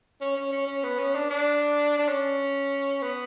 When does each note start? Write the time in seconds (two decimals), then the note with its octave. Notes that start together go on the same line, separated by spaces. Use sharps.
0.21 C#4
0.37 C#4
0.52 C#4
0.67 C#4
0.84 B3
0.99 C#4
1.15 D4
1.30 D4
1.98 D4
2.09 C#4
3.02 B3